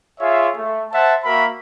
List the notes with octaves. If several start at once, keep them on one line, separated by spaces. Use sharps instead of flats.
F4 G#4 C#5 E5
A3
C5 E5 F#5 A5
A#3 F#4 A#4 E5 B5